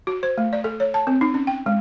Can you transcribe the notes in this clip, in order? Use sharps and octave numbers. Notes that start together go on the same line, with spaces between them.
F#4
C5
A3
D5
A4
C#5
A5
C4
D#4
C#4
G5
G#3